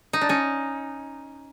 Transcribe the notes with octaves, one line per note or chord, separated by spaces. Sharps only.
D#4
D4
C#4 D#4